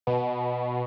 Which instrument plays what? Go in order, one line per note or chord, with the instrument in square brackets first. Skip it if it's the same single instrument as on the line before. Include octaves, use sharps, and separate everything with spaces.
[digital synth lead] B2